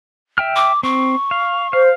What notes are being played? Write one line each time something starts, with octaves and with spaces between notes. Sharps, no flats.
E5 G5 F6
D6
C4 C#6
F5
C5 F5